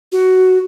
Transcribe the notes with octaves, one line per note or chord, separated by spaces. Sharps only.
F#4